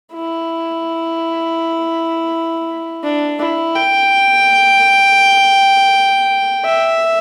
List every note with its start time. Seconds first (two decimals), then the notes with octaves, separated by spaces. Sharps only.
0.13 E4
3.03 D4
3.39 E4
3.75 G5
6.65 E5